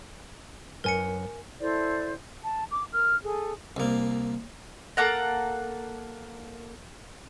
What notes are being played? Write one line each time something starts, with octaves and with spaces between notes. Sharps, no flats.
F#2 A#4 B4 C#5 G#5 C#7
E4 A4 C5 D5
A5
D6
A#4 F6
G#4 A4
C2 A#3
A#3 A4 F#5 A#5